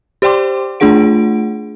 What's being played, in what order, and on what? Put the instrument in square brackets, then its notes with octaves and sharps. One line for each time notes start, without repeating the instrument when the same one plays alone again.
[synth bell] G4 C5 D5 G5 C6 D6
A3 D4 F4 G#4 F#5 D7